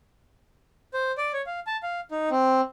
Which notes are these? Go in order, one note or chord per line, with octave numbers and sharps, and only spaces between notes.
C5
D5
C#5
F5
A5
F5
D#4
C4